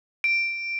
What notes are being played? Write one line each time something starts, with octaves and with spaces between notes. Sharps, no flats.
D7